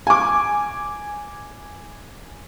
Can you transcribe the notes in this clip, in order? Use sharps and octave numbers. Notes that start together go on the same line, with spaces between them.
G#5 D6